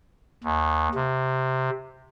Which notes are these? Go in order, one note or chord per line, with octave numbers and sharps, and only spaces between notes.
D#2
C3